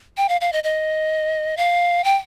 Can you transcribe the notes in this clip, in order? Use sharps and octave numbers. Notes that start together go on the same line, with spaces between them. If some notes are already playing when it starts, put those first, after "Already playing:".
G5
F5
F5
D#5
D#5
F5
G5